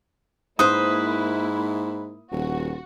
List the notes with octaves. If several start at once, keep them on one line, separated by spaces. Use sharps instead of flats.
G#2 A#3 E4 B4 C5 D#6
D#1 F#4